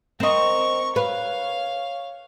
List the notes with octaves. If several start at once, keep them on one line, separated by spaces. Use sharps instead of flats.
C4 A#4 D#5 C#6
B4 C#5 F5